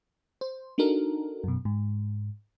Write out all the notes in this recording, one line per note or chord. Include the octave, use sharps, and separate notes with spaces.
C5
D4 D#4 F#4 A4 A#4
F#2 B2
G#2